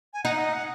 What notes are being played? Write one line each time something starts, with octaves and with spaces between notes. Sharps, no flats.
G#5
D#4 F#5
D#5
F#5